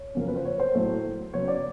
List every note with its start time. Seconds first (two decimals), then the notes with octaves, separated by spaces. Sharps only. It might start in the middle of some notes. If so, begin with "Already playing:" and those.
Already playing: C#5
0.15 F2 C#3 F#3 A#3 C#4 A#4
0.28 B4
0.36 C5
0.45 C#5
0.60 C5
0.75 A2 F#3 A3
1.33 C#3 F#3 B3 C#5
1.48 D5